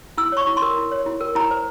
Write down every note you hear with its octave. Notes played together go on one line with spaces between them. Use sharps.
E4 E6
C#5 C#6
E4
C6
A#4
E4
C#5
E4
A#4
E4 A#5
C5